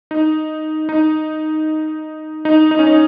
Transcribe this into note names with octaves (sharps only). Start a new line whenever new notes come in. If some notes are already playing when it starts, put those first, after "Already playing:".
D#4
D#4
D#4
D#4
C#4
D#4